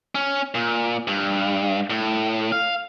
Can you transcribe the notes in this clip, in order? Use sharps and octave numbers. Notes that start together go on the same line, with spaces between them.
C#4
A#2
G2
A2
F5